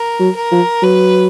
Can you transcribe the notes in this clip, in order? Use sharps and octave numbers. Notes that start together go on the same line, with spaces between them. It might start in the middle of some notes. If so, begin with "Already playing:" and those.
Already playing: A#4
F#3
A#4
F3
F#3 B4